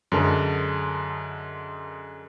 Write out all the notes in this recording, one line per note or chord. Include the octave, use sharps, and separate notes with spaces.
F#2 D3 G#3 A#4 A5